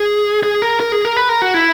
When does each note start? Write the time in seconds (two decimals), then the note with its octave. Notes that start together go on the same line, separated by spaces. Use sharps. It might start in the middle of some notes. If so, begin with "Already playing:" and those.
Already playing: G#4
0.43 G#4
0.62 A#4
0.80 A#4
0.92 G#4
1.05 A#4
1.17 B4
1.29 A#4
1.42 F#4
1.54 E4